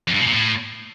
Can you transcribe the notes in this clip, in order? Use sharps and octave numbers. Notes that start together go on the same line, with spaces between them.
F2
G2
B2
A#2
A2